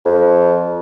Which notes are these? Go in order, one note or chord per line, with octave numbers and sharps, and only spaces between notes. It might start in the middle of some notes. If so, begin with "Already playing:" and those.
F2